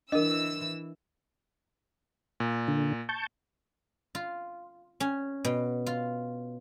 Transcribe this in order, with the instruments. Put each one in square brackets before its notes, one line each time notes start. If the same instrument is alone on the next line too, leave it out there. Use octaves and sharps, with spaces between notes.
[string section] E3 E6 [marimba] D4 [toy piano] A#4 D#5
[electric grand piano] A#2
[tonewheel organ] D3
A5 C#6 G6
[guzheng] F4
C#4
B2
F4